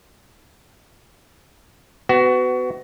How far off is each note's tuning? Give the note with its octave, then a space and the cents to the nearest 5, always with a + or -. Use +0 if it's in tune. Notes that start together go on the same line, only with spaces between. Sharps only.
B3 +30 F#4 +20